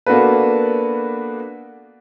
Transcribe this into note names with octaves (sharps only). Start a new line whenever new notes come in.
A#3 B3 D4 F#4 A4 B4